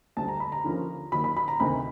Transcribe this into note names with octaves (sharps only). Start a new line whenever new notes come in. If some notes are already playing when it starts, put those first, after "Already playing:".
D2 D3 G3 A5
A#5
B5
A#5
D#2 D3 F3 A#3 C#4
D#2 D#3 F#3 B5
B5
B5
A#5
D2 C3 D#3 B5